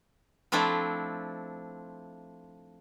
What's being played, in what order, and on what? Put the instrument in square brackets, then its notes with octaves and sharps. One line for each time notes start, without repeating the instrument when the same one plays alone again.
[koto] F3 A3 C4 D4 E4